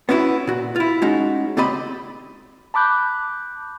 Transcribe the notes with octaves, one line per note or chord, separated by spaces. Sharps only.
B3 C#4 D4 E4 F#4
A#2 F#4
E4 F4
G#3 C#4 D#4 F#4
C#2 A#2 C4 G4 D#5 B5
A5 B5 D6 F#6 G6